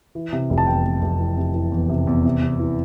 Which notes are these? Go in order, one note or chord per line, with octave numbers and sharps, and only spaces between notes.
E3
C3
F1
A5
E2 G5
F1
F1
E3
C3
E3
E2
C3
E2
C3
C3
E3